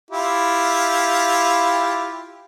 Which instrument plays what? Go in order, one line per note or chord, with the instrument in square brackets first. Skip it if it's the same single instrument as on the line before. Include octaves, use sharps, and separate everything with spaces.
[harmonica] E4 F4 G4